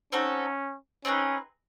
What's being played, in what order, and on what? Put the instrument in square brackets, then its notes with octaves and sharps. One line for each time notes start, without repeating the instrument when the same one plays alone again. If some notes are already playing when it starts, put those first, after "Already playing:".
[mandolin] C4 D#4 F#4 A4 [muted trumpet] C#4
[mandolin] C4 D#4 G#4 B4 [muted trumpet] C#4